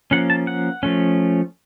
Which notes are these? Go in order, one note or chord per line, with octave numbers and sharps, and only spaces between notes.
F3 A#3 C#4 F#5
A5
F#5
F3 A3 C#4